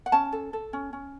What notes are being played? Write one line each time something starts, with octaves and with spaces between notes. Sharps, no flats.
F#5
C#4 A5
A4
A4
C#4
C#4